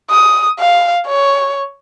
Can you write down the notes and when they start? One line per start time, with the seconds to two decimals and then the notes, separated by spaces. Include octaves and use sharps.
0.10 D#6
0.59 F5
1.08 C#5